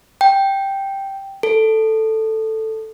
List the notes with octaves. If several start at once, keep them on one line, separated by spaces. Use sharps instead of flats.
G5
A4